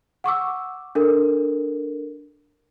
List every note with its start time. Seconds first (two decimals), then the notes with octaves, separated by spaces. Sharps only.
0.24 F#5 C#6 D6 E6
0.95 D4 A4 A#4